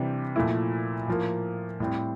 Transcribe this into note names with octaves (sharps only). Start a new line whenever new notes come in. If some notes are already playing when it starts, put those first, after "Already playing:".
Already playing: C3 E3 G3 D4
A#2 F3 A3 E4
A2 F3 A#3
A2 G3 C4